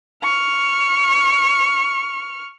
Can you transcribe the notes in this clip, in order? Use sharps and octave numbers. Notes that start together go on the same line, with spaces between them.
C#6 F6